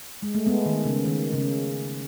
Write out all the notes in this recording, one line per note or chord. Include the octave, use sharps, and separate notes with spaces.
G#3
A3
G#3 B3
D#3
C#3
D#3
C#3